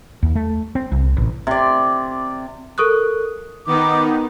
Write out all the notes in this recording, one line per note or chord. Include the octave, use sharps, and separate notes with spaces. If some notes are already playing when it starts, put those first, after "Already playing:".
D#2
A3
C4
C2
A1
C3 D5
A4 A#4 C#6 D#6 F#6
D#3 B3 D#4 D6